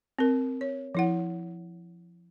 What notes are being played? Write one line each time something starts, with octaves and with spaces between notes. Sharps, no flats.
C4 A#4
C#5
F3 E4 F#5